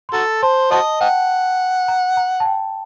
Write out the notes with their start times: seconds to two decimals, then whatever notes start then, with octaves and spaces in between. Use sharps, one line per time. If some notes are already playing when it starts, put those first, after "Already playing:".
0.09 C6
0.14 F#4 A4 A#5
0.42 C5 A5
0.71 F#4 C5 D#5 A5
1.01 D#5 F#5 G5
1.88 A#5
2.17 A#5
2.40 A5
2.45 G5